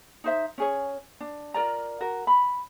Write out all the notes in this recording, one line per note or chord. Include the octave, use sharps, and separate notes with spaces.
D#4 C5 E5
C#4 G#4 C#5
D4
F4 A#4 D5 A#5
F#4 A#4
B5